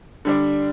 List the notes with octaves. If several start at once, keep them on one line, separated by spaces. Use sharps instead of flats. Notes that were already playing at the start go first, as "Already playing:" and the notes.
D3 G3 D4